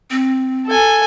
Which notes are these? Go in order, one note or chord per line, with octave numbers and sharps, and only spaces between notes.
C4
A4 G#5